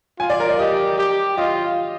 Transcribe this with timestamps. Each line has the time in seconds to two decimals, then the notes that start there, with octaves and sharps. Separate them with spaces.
0.20 F4 G#5
0.30 D5
0.40 A#4
0.49 D5
0.59 G4 D#5
0.98 G4
1.37 F4 D#5